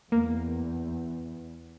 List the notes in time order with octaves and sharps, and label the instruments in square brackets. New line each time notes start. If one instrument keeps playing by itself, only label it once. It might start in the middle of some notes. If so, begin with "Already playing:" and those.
[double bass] E2 [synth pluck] A#3